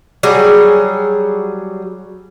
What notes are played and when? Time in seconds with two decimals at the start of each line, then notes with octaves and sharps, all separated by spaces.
0.23 F#3 G3 G#4